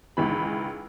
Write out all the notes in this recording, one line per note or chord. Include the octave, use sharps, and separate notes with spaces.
C#2 D#3 E3 B5